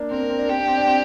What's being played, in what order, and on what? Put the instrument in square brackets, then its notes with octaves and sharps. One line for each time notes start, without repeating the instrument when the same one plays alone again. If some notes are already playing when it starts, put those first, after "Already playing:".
Already playing: [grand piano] A#3 D4
[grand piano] C4 [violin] A#4
[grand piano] A#3
C4
D4
[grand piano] C4 [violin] G4
[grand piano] D4
C4
D4
C4